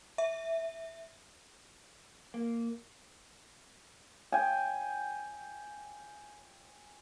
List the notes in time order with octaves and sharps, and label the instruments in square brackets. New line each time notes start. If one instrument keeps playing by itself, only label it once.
[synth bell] E5
[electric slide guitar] A#3
[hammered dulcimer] G5 G#5